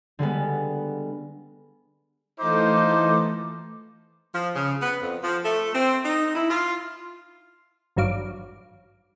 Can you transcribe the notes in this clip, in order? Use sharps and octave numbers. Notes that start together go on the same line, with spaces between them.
D3 G3 G#3 B3
E3 A3 D#4 F4 A4 C5 D6
F3
C#3
B3
F2
F3
A3
C4
D#4
E4
F4
G#1 G2 F#3 F5 D6